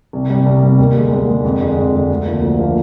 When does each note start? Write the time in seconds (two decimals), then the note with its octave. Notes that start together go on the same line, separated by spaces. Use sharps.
0.13 C2
0.30 C3 G3
0.46 C2
0.62 C3 G3
0.79 D#2
0.95 D3 G#3
1.12 D#2
1.28 D3 G#3
1.45 F2
1.61 D3 G#3
1.77 F2
1.93 D3 G#3
2.10 D2
2.26 D3 F3 A#3
2.42 D2
2.59 D3 F3 A#3